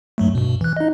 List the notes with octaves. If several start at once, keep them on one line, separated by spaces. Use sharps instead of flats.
G2 F#3 A3
G2 B2
E3 F#6
D#4 D#5